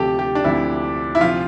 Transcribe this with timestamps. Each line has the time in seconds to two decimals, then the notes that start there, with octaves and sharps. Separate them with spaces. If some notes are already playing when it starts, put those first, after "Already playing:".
Already playing: D2 C3 F3 G4 A4
0.19 G4
0.35 D4
0.44 D2 C3 F3 E4
1.15 E4
1.21 C3 F3 F4